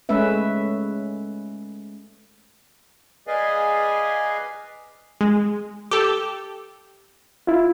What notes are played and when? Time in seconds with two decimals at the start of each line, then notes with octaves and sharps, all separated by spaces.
0.09 G#3 A3 C#4 B4 E5
3.27 G#4 B4 D5 D#5 F5 G#5
5.21 G#3
5.91 G4 A4
7.47 E4 F4